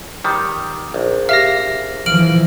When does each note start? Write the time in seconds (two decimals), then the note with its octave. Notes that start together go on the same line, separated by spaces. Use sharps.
0.24 D#3 G3
0.94 A#1
1.29 G4 E5 F5 A#6
2.06 E3 F3 F6 D7 F#7